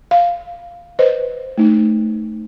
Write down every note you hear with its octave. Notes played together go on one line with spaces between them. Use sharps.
F5
B4 C5 D#5
A3 D#4